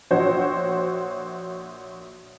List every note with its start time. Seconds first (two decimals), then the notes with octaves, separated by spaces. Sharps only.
0.11 A#1 F#4 C5 C#5